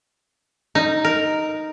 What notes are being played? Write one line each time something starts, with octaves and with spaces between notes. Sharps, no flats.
D#4
A#4